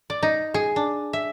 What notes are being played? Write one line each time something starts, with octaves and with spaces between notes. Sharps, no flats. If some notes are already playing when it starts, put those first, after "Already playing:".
D5
D#4
G#4
D4
E5